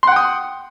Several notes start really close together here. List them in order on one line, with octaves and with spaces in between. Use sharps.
C6 F#5 G5 D#6